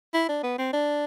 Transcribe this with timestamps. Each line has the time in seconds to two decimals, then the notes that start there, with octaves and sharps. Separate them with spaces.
0.14 E4
0.29 D4
0.43 B3
0.59 C4
0.73 D4